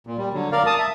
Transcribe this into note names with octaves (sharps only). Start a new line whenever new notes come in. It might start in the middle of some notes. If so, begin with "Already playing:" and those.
A#2
G3
D3 F#3
A#4 D5 F5
A5 D#6
E5